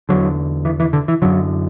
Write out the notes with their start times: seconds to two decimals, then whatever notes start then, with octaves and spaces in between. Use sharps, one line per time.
0.09 E2 D3 F#3
0.65 E3
0.80 E3
0.93 D3
1.08 E3
1.22 F#2 D3 F#3